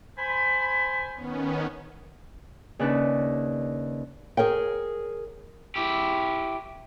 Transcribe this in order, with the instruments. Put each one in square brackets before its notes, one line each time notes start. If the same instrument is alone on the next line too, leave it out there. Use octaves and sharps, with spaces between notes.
[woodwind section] C5 G#5 B5
[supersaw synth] D#3 B3 C#4
[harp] D#2 C#3 D4 B4
[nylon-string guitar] G#4 A#4 C#5 G5
[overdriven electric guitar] E4 G4